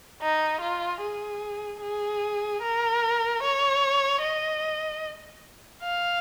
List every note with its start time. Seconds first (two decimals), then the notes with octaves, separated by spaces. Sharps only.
0.22 D#4
0.61 F4
1.02 G#4
1.82 G#4
2.62 A#4
3.42 C#5
4.22 D#5
5.83 F5